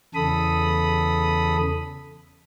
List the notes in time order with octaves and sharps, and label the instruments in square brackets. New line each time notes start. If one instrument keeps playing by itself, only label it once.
[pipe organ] E2 C#3 A4 B5 D#6